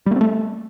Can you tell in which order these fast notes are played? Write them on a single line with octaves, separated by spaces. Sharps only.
G3 A#3 C4 A3